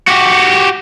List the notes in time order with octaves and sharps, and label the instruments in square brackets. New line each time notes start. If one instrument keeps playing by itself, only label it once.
[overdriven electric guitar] F#4 G4